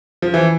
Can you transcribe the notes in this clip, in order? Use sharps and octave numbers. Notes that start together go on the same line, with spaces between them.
F3
E3